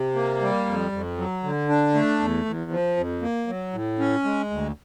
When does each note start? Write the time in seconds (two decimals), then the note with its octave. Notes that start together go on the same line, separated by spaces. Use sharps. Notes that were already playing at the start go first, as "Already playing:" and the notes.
Already playing: C3
0.15 A#3
0.41 G3
0.66 F2
0.92 F2
1.17 F#3
1.43 D3
1.69 D4
1.94 A3
2.20 E2
2.45 E2
2.71 F3
2.97 F2
3.22 A#3
3.47 F#3
3.73 A2
3.99 C#4
4.24 G#3
4.51 D2